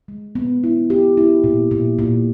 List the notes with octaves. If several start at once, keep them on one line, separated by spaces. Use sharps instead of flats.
G#3
B3
E4
G4
E4
A#2
A#2
A#2